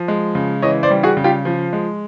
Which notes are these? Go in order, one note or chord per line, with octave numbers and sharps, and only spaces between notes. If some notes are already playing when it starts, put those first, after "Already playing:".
Already playing: F3
G#3
C#3
E3 C#5 D#5
C5 D5
G3
F#4 G#4
C#3
F4 G4
F3
G#3